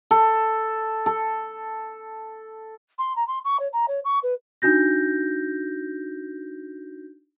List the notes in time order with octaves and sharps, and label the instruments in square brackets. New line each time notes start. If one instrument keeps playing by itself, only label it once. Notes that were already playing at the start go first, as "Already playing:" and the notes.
[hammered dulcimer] A4
A4
[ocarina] C6
A#5
C6
C#6
C#5
A#5
C#5
C#6
B4
[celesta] D4 D#4 F#4 G6 A#6